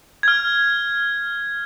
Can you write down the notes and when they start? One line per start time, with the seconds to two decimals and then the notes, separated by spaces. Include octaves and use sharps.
0.23 F6 G#6